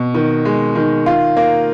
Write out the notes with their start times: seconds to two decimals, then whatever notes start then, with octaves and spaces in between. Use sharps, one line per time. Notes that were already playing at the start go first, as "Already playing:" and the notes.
Already playing: B2
0.14 D#3
0.45 G#3
0.76 D#3
1.06 F4
1.37 A#3